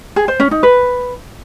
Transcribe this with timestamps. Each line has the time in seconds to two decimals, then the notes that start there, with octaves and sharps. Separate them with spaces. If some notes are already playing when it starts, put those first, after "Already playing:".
0.16 G#4
0.28 C5
0.40 C#4
0.51 D#4
0.63 B4